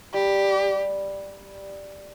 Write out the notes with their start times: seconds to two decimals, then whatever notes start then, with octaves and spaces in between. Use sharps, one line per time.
0.13 G3 G4